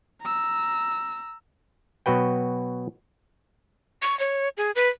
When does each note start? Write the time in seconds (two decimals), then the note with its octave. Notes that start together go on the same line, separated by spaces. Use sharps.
0.22 A#5 E6
2.06 B2 F#3 F#4 B4 G5
4.02 C#6
4.20 C#5
4.57 G#4
4.75 B4